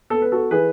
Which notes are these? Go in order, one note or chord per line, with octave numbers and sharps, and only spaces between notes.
B3 A4
B4
F#4 A4
E3 G#4 B4